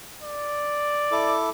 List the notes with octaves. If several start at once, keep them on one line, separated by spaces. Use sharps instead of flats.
D5
E4 A4 D6